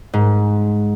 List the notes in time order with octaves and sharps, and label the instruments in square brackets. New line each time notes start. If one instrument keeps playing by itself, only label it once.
[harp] G#2